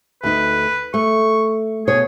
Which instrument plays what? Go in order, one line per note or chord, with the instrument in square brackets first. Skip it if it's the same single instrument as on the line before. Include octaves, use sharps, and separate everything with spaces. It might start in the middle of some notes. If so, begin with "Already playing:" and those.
[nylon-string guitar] D2 D#4 [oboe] B4
[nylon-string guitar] A3 [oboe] C#6
[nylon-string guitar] B2 C#5 [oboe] G#4